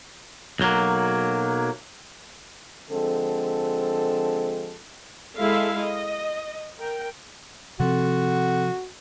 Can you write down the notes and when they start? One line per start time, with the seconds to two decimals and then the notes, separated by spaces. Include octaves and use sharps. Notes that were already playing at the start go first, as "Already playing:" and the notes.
0.60 B1 F#3 A#3
2.91 D3 F3 G#3 C4 A4
5.38 G#3 E4 A4 E5 F5
5.81 D#5
6.77 A#4 G5
7.80 C3 F3 C4 F#4 A4 F#5